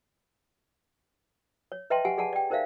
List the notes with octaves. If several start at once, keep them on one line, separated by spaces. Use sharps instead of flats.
C#5
B4 D#5 E5 G5 A5 C6
G4 F#5 G#5
G#4 D5 F#5 G#5 A5
D5 G5
D#4 A#4 C5 D5 E5 F5